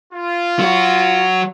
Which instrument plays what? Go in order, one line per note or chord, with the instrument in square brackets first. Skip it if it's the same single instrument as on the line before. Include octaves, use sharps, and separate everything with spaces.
[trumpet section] F4
[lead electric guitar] F#3 F#4